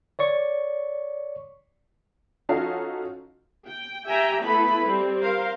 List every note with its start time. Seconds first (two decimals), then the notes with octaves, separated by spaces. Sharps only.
0.19 C#5 D5 C#6
2.49 F3 C#4 D#4 F#4 A4 F5
3.66 G5
4.07 G4 E5 G5 G#5 A#5
4.42 A3 B3 E4 A4 B4 B5
4.83 G3 C4
5.22 A#4 C5 F5